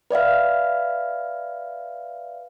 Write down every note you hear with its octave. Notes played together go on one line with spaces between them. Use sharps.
B4 D5 E5 F5